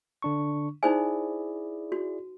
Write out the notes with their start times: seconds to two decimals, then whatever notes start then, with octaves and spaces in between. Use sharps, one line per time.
0.22 D3 D4 C#6
0.83 D#4 E4 G#4 C5 D5 G#5
1.92 F#4